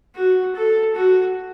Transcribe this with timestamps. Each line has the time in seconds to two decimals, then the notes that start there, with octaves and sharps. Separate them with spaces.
0.16 F#4
0.55 A4
0.95 F#4